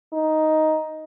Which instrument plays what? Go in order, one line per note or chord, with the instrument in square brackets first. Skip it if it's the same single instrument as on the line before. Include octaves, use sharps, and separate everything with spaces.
[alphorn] D#4